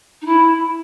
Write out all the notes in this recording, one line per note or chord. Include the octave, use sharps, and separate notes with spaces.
D#4
E4